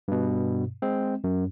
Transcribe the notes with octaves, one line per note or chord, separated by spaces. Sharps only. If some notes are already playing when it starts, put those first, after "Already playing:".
G2 B2
G#3 C4
F#2